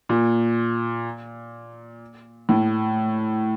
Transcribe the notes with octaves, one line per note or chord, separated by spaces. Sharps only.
A#2
A2